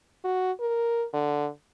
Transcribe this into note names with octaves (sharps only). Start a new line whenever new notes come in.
F#4
A#4
D3